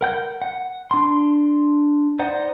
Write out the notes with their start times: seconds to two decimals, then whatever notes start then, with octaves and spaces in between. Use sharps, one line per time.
0.01 A#4 F#5 G6
0.42 F#5
0.91 D4 C6
2.19 D#4 C5 D5 F#5